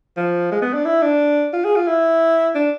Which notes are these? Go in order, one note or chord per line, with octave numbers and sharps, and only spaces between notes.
F3
G#3
B3
D4
E4
D4
F4
G#4
F4
E4
D4